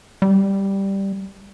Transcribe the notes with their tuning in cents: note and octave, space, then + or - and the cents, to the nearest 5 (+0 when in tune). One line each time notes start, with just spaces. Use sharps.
G3 +0